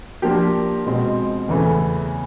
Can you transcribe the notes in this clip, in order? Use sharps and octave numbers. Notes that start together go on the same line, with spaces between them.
F3 A#3 D4 G4
B2 G#3 C4
E2 C#3 E3 A3